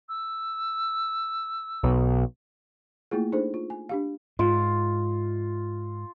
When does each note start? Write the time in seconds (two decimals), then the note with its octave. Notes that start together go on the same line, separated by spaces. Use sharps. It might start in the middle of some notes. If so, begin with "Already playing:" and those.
0.09 E6
1.84 B1
3.11 A3 A#3 E4 F4 G#4
3.32 D4 D#4 G#4 A4 C5
3.54 F4
3.70 G#5
3.89 D4 G4 F5
4.39 G#2 F4